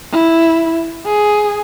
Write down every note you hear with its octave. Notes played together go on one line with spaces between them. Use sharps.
E4
G#4